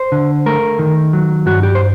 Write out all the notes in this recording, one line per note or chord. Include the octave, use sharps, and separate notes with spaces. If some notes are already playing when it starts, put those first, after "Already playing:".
Already playing: C5
D3
A3 A#4
D#3
F#3
G2 F#4
G4
C5